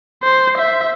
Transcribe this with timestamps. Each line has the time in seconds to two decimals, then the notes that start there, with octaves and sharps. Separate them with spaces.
0.23 C5
0.58 E5